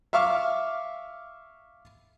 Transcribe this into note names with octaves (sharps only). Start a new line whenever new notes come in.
E5 F5 C#6 D6 F6